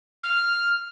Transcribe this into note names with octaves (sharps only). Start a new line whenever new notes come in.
F6